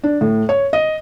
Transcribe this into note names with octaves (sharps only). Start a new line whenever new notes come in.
D4
A2
C#5
D#5